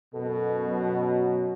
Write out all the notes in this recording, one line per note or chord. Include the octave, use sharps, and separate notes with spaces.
F#2 B2 A4
F#3